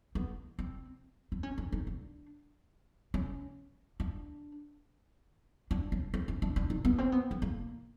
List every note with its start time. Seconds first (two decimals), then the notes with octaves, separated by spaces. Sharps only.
0.15 B3
0.59 C4
1.32 D4
1.43 C#4
1.58 D4
1.72 D#4
1.87 D4
3.14 C#4
4.00 D4
5.71 D4
5.92 C#4
6.14 C4
6.28 C#4
6.42 D4
6.56 D4
6.70 D#4
6.85 B3
6.98 C4
7.12 B3
7.31 B3
7.42 A#3